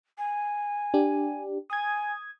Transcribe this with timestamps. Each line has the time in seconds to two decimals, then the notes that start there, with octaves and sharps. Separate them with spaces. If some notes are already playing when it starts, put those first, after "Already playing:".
0.17 G#5
0.94 D4 G4
1.70 G#5 D#6 G#6